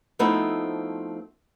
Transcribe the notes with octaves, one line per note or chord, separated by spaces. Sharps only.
F3 A3 B3 C4 D#4 E4